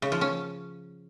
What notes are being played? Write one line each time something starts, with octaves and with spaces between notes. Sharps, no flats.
C#3
F3
C#4